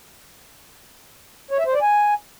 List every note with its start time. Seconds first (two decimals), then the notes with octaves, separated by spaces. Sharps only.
1.51 C#5
1.59 E5
1.66 C5
1.74 D5
1.82 G#5